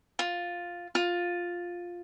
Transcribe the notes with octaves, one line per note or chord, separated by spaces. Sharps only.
F4
F4